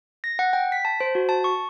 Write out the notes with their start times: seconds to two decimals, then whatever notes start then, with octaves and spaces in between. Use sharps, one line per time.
0.24 A#6
0.39 F#5
0.53 G5
0.72 B6
0.85 A5
1.00 C5
1.15 F#4
1.29 A5
1.44 C#6